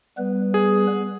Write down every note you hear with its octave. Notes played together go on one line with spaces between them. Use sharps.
G3 B3 B4
G#4